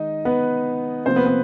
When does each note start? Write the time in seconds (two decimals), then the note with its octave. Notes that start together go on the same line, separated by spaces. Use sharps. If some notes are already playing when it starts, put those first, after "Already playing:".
Already playing: D#3 G#3 D#4 D#5
0.25 B3 B4
1.06 C3 F3 A#3 C4 C5
1.16 B3 B4
1.26 B3 B4